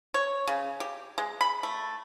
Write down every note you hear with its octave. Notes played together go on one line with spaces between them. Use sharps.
C#5
C#3
G4
G#3
B5
A3